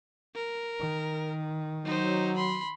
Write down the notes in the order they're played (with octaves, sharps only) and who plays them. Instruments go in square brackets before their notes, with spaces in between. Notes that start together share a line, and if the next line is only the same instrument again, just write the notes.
[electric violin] A#4
[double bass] D#3
[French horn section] F#3 [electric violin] D#4 C5
[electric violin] B5 C6